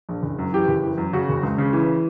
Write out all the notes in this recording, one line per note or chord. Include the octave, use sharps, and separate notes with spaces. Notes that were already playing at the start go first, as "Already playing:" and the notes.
A#1
F#1
F#2
E3 G4
F#1
E3
F#2
C#3 F#4
F#1
C#2
C#3
E3